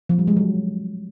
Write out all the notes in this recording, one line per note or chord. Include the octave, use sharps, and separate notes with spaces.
F3
G3
G#3
F#3